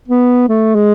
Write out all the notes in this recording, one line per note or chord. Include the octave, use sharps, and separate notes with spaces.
B3
A3
G#3